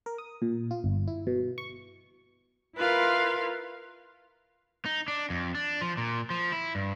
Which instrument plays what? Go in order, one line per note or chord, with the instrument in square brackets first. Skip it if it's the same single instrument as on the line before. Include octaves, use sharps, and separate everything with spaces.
[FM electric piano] A#4
D#6
A#2
F4
G1
E4
B2
C#6
[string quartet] E4 F4 A#4 B4 F5 C6
[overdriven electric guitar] D#4
D4
F2
D4
F3
A#2
F3
E4
G2